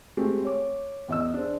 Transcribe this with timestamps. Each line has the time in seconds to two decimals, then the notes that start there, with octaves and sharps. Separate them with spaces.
0.17 G#3 A3 C4 G4
0.45 C#5 D6
1.09 E2 D#5 E6
1.34 D4 G#4 C5